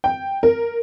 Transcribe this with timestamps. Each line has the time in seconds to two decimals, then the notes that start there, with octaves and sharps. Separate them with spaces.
0.04 G5
0.43 A#4